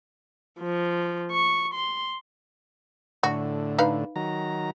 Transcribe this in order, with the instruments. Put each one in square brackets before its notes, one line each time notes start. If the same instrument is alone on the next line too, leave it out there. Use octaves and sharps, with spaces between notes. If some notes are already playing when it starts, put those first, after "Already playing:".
[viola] F3
C#6
C6
[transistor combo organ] A2 D3 [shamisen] F#4
[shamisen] D#4 B4 F5
[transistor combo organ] D#3 F#3 A#5